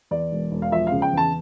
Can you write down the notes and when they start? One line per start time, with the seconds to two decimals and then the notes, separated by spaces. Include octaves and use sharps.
0.11 E2 D5
0.32 E1
0.51 E1
0.62 F5
0.71 F3 E5
0.87 C#3 F5
1.02 G5
1.13 E2 A5